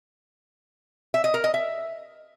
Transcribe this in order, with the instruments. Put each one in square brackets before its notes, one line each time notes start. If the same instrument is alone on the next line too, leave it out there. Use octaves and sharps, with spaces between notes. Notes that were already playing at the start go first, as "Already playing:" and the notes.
[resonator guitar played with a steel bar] E5
D#5
A#4
D#5
E5